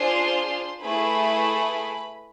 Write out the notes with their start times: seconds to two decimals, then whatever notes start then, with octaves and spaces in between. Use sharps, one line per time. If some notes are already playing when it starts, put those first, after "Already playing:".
Already playing: D4 F4 G#4 C5 C6
0.82 A3 E4 G#4 B4 B5